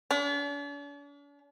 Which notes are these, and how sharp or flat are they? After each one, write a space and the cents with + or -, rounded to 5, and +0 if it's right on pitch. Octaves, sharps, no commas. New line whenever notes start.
D4 -45